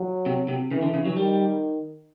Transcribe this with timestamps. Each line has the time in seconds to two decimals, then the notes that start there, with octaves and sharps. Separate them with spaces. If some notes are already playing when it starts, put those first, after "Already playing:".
Already playing: F#3
0.26 C3
0.48 C3
0.71 C#3 E3
0.83 D3
0.94 C#3
1.05 F#3
1.16 D#3 G3